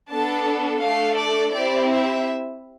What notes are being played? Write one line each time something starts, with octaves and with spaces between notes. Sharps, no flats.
B3 D4 A4 A5
A3 D4 A4 F5
D5
C4 E4 G4 D5
E5